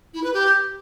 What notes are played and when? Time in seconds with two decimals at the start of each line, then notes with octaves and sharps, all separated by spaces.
0.14 E4
0.24 B4
0.34 G4